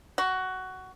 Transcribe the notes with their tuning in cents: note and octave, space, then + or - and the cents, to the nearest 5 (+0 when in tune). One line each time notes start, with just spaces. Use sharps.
F#4 +15